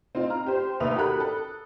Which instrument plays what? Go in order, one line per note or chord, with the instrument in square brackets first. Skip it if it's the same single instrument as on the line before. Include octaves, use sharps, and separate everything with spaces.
[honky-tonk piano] C4 D#4 F4
A#5 F6
G4 C5
D#2 B4 E5 D#6 F7
F#4 G4 A4 A#4 B5 F#6
A4